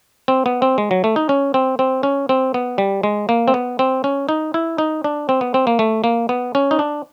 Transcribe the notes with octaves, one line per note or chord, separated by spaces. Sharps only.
C4
B3
C4
G#3
F#3
A3
D#4
C#4
C4
C4
C#4
C4
B3
G3
G#3
A#3
C4
B3
C4
C#4
D#4
E4
D#4
D4
C4
B3
C4
A#3
A3
A#3
B3
C#4
D#4
D4